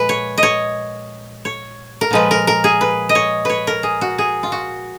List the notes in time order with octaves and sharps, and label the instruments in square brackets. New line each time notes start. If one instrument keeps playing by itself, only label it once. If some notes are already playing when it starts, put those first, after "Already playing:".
Already playing: [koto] A#2 F3 G#3 B4
C#5
D#5
C#5
C#5
A#4
A#2 F3 G#3 B4
A#4
A#4
G#4
B4
D#5
C#5
B4 C#5
A#4
G#4
F#4
G#4
F4
F#4